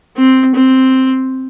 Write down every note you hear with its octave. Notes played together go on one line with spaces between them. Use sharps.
C4
C4